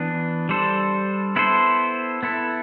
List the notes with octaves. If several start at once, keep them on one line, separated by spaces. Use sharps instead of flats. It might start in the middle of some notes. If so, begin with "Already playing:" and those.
Already playing: E3 B3 D4
G3 D4 A4 C5
B3 E4 A4 C5
B3 E4 A4